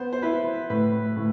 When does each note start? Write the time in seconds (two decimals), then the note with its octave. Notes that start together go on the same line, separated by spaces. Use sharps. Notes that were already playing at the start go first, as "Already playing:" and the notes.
Already playing: B3 C5
0.13 C5
0.22 E4 B4
0.70 A2 B4
1.16 A2